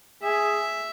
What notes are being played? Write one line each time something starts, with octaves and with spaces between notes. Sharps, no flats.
G#4 E5